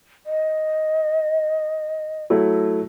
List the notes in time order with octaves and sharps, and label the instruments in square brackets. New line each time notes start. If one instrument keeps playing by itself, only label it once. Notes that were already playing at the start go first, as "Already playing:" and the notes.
[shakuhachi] D#5
[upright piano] F#3 A3 E4